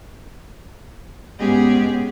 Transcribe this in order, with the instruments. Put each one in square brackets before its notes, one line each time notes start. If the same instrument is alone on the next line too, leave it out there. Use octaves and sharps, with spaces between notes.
[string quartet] G#2 G#3 B3 C#4 G4 G#4